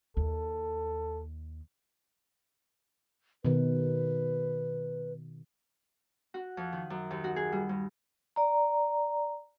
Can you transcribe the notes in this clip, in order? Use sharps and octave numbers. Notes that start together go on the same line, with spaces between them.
D#2 A4
B2 D#3 B4
F#4
F2
D#3
F#2
D#2
F#4
G#4
G3
G2
D5 A#5